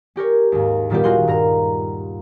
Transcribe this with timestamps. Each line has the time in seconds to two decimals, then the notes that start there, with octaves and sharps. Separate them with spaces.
0.16 C#4 G4 A#4 C#5
0.52 D#2 G#2
0.90 A#2 D#3 G3 B3 F4 G4
1.04 D#4 F4 F#4 G#4 C6
1.27 G2 A#4 A#5